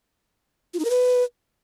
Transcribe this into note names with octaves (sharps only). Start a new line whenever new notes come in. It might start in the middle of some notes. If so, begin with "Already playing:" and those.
F4
D#4
A#4
B4